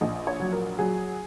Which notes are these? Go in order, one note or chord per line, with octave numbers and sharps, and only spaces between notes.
A#1 D#5
C#5
F#3
A#4
F#3 G#4